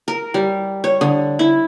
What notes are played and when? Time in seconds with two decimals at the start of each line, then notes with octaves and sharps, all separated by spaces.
0.08 A#4
0.34 G3
0.84 C#5
1.01 D3
1.39 E4